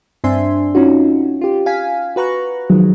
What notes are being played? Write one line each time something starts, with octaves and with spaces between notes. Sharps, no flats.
G2 C4 D4 E5 G#5 C6
C#4 D#4 F4 F#4
F4 G4
F5 G#5 B6
F#4 B4 A#5 C#6 F#6
D#3 F3 F#3 G#3